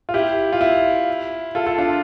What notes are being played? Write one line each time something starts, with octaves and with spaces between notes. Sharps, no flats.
F4
E4 G4
F4
E4
F4 A4
F4 A4
D4 F4